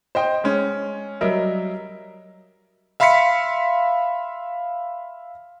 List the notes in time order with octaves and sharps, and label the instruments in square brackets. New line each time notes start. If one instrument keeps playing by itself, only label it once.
[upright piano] C5 D#5 G5
G#3 C#4
F#3 G3 A#4 D#5 E5
[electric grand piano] E5 F5 B5 C6 B6 C#7